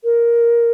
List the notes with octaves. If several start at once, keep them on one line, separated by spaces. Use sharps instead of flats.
A#4